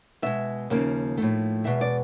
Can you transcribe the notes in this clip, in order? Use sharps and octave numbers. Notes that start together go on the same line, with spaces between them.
B2 G#3 E5
D#2 C#3 F3 A#3
A2 F3 A3
E2 B2 G#3 E5
D5